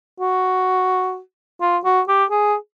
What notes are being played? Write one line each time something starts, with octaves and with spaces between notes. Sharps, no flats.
F#4
F4
F#4
G4
G#4